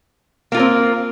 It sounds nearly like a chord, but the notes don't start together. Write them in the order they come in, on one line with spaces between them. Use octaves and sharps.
A#3 F4 A#4 C4